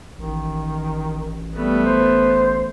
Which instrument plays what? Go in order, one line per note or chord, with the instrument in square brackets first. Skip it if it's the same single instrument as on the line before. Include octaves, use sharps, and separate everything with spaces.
[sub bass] A1 [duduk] D#3
[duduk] G3 [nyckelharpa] A3 B3
[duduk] C5